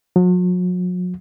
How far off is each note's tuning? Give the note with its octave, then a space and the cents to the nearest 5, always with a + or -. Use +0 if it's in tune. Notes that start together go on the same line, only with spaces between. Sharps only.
F#3 -40